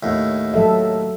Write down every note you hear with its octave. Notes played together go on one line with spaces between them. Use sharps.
D#2 A2
F#3 A4 E5